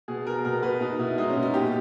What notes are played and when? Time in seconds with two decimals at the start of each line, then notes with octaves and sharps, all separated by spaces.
0.08 B2 G#4
0.26 B2 A#4
0.45 B2 A#4
0.63 B2 B4
0.81 B2 D#4
0.99 B2 E4
1.18 G#3 D#4
1.29 C#4
1.36 B2
1.43 D#4
1.54 A#2 G4